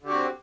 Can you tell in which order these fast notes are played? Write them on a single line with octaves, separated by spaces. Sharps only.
D3 G4 F#4 C4